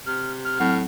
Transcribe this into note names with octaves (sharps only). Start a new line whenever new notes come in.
C3 F6
F6
A2 F#3 C4 F#5